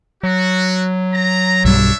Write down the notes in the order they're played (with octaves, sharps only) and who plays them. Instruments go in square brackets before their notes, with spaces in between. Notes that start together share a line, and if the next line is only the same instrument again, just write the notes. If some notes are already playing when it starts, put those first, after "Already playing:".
[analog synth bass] F#3 [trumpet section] F#4
[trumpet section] A#5
[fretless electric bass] B1 G2 G3 [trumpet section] D4 C#5 E5